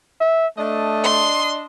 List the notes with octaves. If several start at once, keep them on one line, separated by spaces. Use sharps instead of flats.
E5
A3 D4 D#5
C6